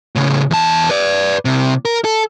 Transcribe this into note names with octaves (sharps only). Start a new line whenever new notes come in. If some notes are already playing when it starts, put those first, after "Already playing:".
A2 C#3
E2 A5
B4 D5
C2 C3
A#4
A4